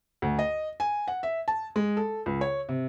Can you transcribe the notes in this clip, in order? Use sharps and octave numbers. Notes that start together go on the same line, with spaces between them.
D2
D#5
G#5
F#5
E5
A5
G#3
A4
C#2
C#5
C3